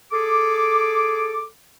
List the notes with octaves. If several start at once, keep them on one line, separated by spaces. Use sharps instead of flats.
G#4 A4 D6